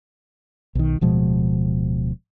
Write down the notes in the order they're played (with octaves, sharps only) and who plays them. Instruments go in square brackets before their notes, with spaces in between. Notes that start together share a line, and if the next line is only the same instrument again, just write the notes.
[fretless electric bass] B1 D#3
D1 B2 F3 G#3